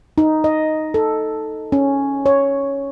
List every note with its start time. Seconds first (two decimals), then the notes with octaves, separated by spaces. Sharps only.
0.18 D#4
0.44 D#5
0.94 A4
1.72 C#4
2.26 C#5